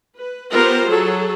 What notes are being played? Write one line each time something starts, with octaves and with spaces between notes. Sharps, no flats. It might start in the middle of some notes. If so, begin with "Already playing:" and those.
B4
B3 F4 G4 A#4 C5
F#3 G#4 A4